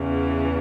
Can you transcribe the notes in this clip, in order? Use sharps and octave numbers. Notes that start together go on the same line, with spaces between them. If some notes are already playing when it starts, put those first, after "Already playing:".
Already playing: E2 C#3 E3